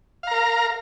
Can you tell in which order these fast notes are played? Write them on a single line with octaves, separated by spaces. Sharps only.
F5 A#5 A#4